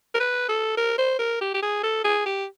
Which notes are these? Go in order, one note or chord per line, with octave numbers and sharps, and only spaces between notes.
A#4
B4
A4
A#4
C5
A#4
G4
G4
G#4
A4
G#4
G4